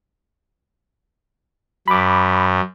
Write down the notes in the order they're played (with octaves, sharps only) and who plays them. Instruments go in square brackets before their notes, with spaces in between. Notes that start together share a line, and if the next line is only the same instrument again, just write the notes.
[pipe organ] F#2 [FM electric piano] B5 D6